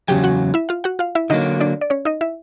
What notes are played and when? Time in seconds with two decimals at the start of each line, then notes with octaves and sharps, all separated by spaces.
0.08 E2 C#3 F#3 G4 G5
0.24 F#4 F#5
0.54 E4 E5
0.69 F4 F5
0.84 F#4 F#5
0.99 F4 F5
1.15 E4 E5
1.30 D3 F#3 A#3 D#4 D#5
1.60 D4 D5
1.81 D5
1.90 C#4 C#5
2.05 D#4 D#5
2.21 E4 E5